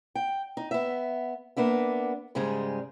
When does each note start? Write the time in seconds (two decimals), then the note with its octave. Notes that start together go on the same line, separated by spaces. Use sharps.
0.15 G5
0.57 D#4
0.71 B3 E5
1.57 A#3 B3 D4 E5
2.35 G#2 C#3 G3 G#3 G#4